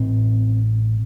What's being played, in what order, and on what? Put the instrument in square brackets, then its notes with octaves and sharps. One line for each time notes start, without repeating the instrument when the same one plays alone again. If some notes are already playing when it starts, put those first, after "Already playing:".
Already playing: [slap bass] A1 A2 C4